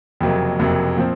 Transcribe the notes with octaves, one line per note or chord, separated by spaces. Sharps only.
F#1 F2 C3 F#3 A#3
F#1 F2 C3 F#3 A#3
A#2 F3 C4